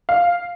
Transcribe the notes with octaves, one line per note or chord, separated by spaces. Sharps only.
F5